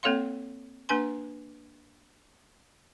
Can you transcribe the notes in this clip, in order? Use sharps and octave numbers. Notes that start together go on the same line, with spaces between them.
A#3 C4 A4 C#5 F5 C6
A#3 D4 B4 G#5 C6